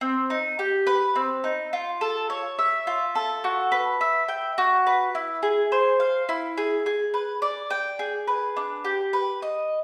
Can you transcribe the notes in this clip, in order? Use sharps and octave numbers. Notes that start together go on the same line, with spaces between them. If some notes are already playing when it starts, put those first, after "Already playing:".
C4
D#4
G4
B4
C4
D#4
F4
A4
C#5
E5
F4
A4
F#4
B4
E5
G5
F#4
B4
E4
G#4
C5
F5
E4
G#4
G#4
B4
D5
G5
G#4
B4
D4
G4
B4
D#5